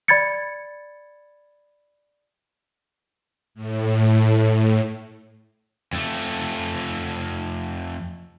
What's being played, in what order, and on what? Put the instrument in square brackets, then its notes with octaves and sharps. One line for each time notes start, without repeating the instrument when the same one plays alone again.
[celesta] D5 B5 G#6 A6 C#7
[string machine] A2
[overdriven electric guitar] F2 A3